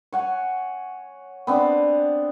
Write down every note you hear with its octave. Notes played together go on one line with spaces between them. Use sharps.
C#5 F#5 G#5
B3 C4 D4